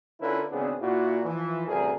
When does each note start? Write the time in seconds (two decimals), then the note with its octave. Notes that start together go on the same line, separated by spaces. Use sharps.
0.20 D3 C#4 E4 F4 A#4 B4
0.50 G#1 C#3 B3 C4 D4 G#4
0.80 A#2 E4 F#4
1.24 E3 F3
1.67 A1 D2 G2 C3 G#4 A#4